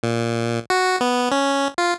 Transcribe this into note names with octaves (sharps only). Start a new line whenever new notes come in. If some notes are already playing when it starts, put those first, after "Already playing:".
A#2
F#4
B3
C#4
F4